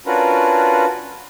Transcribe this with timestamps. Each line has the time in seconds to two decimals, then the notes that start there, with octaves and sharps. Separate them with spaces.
0.06 C#4 D4 F4 F#4 A#4 B4